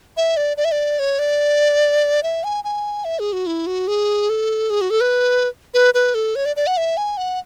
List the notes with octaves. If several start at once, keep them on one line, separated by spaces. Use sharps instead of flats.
E5
D5
D5
E5
D5
C#5
D5
E5
G#5
G#5
E5
G#4
F#4
E4
F#4
G#4
A4
G#4
F#4
A4
B4
B4
B4
A4
C#5
D5
D5
F#5
E5
G#5
F#5